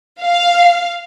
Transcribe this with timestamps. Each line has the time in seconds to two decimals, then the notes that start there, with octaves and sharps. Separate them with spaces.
0.21 F5